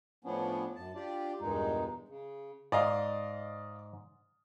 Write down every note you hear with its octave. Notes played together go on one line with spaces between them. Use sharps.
A2 F3 B3 C#4 D4
F#2 A5
D4 F4 G4 D5
E2 G2 A#2 G#3 D#4
C#3
G#2 D5 D#5 F5